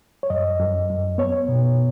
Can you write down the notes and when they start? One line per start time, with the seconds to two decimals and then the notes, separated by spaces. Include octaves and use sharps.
0.23 C#5
0.30 F#2 D#5
0.60 F#2
0.89 F#2
1.18 B3 C#5
1.48 B2